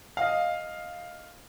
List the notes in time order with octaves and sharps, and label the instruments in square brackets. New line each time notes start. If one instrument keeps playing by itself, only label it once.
[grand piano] D#5 F5